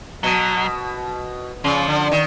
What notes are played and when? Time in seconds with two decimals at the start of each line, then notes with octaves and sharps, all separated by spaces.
0.23 B2 F#3
1.64 C#3 F3
1.88 D3
2.11 D#3